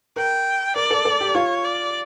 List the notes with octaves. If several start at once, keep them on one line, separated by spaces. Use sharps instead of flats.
A#4 G5
A#4 D5
A4
A4
G4
F4 C#5
D5